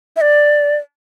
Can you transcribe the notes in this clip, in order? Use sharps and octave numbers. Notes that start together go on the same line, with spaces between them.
E5
D5